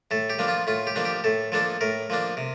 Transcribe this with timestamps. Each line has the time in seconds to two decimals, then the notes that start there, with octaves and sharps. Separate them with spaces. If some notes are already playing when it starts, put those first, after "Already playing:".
0.11 A2 A4
0.30 G4
0.39 F3 A#3 D4
0.48 F4
0.67 A2 F4
0.87 G4
0.96 F3 A#3 D4
1.05 G4
1.24 A2 A4
1.52 F3 A#3 D4 A4
1.81 A2 A#4
2.10 F3 A#3 D4
2.37 C3